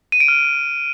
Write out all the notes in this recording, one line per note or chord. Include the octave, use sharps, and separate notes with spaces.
D#7
D7
F6